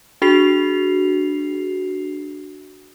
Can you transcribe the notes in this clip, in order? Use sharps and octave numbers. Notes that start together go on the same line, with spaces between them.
D4 F#4 G#4 C7 F7